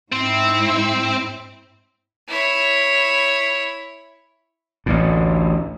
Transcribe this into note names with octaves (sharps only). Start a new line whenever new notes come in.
G#2 C4 E4
E4 C#5
A1 D2 A2